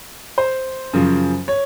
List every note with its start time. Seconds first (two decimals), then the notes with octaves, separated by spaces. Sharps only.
0.38 C5
0.93 F#2 C#3 F3
1.48 C#5